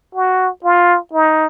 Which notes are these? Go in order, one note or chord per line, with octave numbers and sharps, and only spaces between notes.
F#4
F4
D#4